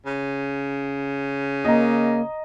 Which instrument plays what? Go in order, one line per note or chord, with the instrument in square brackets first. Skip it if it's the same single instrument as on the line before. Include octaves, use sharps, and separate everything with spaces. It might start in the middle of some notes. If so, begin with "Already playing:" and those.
[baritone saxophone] C#3
[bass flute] A#3 [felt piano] D#5 A#5